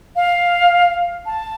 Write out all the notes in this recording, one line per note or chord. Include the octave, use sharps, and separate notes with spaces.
F5
A5